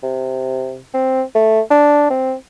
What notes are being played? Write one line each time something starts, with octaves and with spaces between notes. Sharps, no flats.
C3
C4
A3
D4
C4